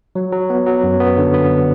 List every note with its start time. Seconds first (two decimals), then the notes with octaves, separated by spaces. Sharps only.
0.15 F#3
0.32 F#3
0.50 B3
0.66 F#3
0.83 F#2
1.00 B3
1.17 D3
1.34 B3